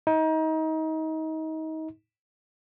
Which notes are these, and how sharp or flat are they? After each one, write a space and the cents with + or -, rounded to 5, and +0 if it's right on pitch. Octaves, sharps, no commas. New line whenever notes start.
D#4 +30